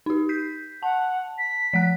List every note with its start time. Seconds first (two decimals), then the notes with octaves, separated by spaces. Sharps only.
0.06 D#4 G4
0.29 G6 B6 C7
0.83 F#5 A5
1.38 B6
1.73 F3 F#5 F#6